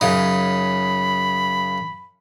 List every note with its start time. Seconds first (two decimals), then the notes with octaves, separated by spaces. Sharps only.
0.01 F#2 C#3 D#4 B5